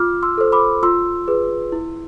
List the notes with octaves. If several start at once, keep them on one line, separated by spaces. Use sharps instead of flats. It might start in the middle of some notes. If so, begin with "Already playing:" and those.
Already playing: F4 D6 F6
C6 E6
A4 C5
B5 D6
F4 C6 E6
G#4 B4
E4